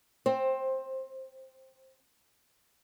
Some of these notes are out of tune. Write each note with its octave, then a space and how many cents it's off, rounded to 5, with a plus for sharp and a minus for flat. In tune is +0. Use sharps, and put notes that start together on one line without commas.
C4 +5 C5 +20